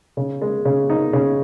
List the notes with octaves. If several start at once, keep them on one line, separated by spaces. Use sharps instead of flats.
C#3
G#3
C#3
D#4
C#3